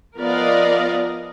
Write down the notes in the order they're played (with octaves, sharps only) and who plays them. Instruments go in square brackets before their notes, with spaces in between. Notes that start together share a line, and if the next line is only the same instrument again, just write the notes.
[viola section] F3 B3 A#4 D5 D#5 F5